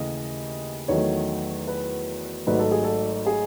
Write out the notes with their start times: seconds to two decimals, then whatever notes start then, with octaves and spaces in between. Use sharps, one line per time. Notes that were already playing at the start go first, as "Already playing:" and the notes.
Already playing: D#2 C#3 E3 A3 D#5
0.88 E2 D#3 F#3 A3 C#5
1.67 B4
2.47 G#1 G#2 F#3 A3 B4
2.59 A4
2.72 G#4
2.84 A4
3.26 G#4